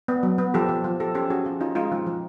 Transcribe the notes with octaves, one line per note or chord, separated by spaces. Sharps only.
B3
F#3
B3
F3 G4 A4
F3
F3
F3 G4 A4
C#4 G4 A4
C#4 F#4 G#4
F3 F4 G4
C#4 D#4 F4
G#3 D#4 F4
F3
F3